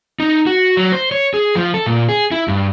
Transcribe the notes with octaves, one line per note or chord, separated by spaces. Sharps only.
D#4
F#4
F#3
C5
C#5
G#4
F3
A4
A#2
G#4
E4
G2